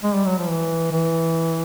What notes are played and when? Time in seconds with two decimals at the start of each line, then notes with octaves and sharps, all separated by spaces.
0.03 G#3
0.15 G3
0.26 F#3
0.38 F3
0.49 E3
0.92 E3